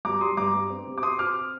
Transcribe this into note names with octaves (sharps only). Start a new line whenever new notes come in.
G2 A#5 D6
G3 C6 D#6
G2 A#5 D6
G2
C4
C3
D6
C4 C6 D#6
C4 D6 F6